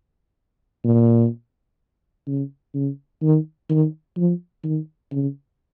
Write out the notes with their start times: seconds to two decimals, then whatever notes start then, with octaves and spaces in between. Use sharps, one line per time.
0.84 A#2
2.27 C#3
2.74 C#3
3.22 D#3
3.70 D#3
4.17 F3
4.64 D#3
5.12 C#3